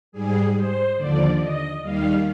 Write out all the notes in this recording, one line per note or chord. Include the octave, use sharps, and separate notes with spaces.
G#2 G3 G#4
C5
D#2 D3 F3 D5
D#5
D#2 D#3 G3 F5